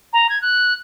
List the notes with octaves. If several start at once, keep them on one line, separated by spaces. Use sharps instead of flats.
A#5
G#6
F#6